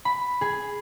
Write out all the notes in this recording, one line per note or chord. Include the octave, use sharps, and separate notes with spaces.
B5
G#4